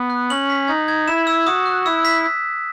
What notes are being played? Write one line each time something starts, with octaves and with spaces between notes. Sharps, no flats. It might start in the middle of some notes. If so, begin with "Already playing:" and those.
Already playing: B3
F#6
C#4 F#7
B6
D#4 G#6
G#6
E4 E7
E6
F#4 D#6
F#6
E4 E6
B6